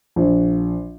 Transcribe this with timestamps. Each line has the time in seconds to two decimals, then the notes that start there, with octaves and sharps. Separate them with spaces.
0.16 A#1